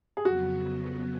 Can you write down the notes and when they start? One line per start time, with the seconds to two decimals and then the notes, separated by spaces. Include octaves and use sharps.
0.17 G#4
0.25 F2 C#3 F#3 B3 F#4